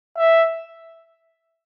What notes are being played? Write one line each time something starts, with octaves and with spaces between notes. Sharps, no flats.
E5